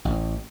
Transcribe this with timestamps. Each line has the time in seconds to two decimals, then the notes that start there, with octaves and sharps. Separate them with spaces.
0.05 A1